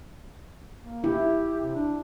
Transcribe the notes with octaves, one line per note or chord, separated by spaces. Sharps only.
A#3
E4 G4
C3
D4